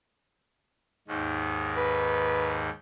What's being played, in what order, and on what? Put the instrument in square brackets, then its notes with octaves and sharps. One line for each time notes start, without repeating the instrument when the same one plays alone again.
[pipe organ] D#2 G#2 D#3
[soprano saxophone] B4